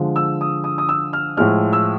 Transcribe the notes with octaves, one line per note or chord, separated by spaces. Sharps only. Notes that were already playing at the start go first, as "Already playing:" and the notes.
Already playing: D3 F3 G#3
E6
D#6
D#6
D#6
E6
F6
A2 F3 G#3 F6
E6